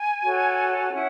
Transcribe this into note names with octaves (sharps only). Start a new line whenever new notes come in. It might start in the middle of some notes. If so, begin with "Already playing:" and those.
Already playing: G#5
F#4 A4 C#5
C#4 E4 F#5